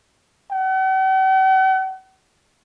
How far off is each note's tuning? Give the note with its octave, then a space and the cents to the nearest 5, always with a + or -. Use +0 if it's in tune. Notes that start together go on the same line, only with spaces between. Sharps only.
F#5 +45